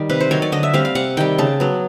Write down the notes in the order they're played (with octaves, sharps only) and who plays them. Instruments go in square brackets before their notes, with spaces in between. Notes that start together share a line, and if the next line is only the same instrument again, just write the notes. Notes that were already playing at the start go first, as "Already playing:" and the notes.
Already playing: [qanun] D#3 G3
C3 B4
C5
D#3 F#3 C#5
D5
D3 D#5
E5
G3 C4 F5
F5
C3 F#5
D#3 G3 G5
C#3 A5
F#3 B3